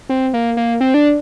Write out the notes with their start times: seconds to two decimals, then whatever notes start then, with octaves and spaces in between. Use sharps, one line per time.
0.09 C4
0.34 A#3
0.57 A#3
0.81 C4
0.94 D4